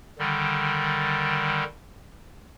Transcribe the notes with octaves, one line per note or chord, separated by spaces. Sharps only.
D3 D#3 G3